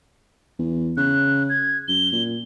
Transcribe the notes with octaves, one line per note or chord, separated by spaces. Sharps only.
E2
C#3 F#6
G#6
F#2 G7
A#2